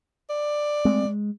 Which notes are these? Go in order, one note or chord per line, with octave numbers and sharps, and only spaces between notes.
D5
G#3 A3 C4
G#3